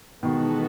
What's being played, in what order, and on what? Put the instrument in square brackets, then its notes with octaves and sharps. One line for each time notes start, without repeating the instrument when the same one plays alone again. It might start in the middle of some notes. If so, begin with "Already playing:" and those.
[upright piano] B2 D#3 [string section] E3 G#3 B3 F#4 A4